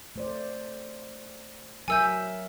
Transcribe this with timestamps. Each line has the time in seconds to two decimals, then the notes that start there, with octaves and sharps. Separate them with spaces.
0.16 A3 C5 D5
1.88 F#3 A#4 E5 G#5 E6 G6